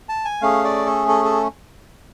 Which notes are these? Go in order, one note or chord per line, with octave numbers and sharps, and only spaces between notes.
A5
G#5
A3 C#4 G#4 F5
D5
A4
A4
A4